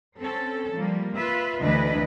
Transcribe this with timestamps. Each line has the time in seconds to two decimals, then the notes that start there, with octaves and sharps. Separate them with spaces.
0.19 C4 C#4 A4
0.74 F3 G3 A#3
1.14 F4 B4 E5
1.63 D2 E3 D4 E4 B4 D#5